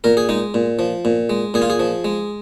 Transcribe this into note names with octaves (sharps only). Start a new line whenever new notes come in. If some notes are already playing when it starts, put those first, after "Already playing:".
A#2 A#4
G#4
G#3 D#4
A#2
F3
A#2
G#3
A#2 G#4
F4
G#4
F3
G#3